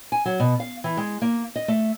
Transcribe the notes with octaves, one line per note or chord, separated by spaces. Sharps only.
G#5
F#3
B2
F5
E3
G#3
A#3
D#5
A3